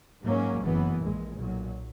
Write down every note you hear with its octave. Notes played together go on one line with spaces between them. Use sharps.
G#2 F#3 A#3 C#4
F#1 F#2 E3 B3
A#1 A#2 G#3
B1 A#2 F#3